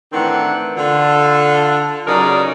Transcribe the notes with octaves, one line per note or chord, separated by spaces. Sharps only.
A2 D#3 E3 C4 D4 F#5
D3 F4 A4
C#3 F#3 D#4 A#4 D5